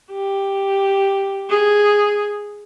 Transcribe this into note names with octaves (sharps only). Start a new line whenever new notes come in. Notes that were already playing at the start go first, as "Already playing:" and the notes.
G4
G#4